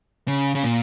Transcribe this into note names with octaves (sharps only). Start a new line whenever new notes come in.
C#3
C#3
A#2